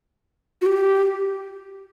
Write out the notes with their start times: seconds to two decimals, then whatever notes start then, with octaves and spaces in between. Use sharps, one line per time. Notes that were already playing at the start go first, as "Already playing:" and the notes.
0.62 F#4
0.66 G4